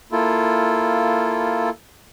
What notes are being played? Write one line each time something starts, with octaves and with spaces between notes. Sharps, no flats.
A#3 E4 F4 A4